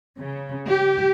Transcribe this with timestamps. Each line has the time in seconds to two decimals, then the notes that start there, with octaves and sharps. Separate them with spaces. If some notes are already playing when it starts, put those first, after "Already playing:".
0.19 C#3
0.69 G4